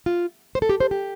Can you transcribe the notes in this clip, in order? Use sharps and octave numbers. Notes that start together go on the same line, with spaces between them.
F4
C5
A4
G4
C5
G4